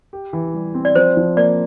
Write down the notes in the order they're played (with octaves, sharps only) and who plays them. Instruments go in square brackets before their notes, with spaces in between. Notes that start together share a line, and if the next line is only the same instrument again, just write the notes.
[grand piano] G4
E3
G3
C4
[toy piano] D5
[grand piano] F3 [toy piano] C5
[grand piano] F3
[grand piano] A#3 [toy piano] D5